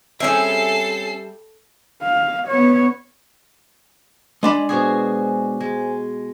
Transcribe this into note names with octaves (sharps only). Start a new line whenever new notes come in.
G3 C4 C#4 G#4 A4 E5 C7
F5
B3 C#5
G#3 D4 D#5 B5
B2 F#4 G#4 C5 G#5
G#3